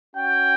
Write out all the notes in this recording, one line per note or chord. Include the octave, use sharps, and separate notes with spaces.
C#4 F#4 G5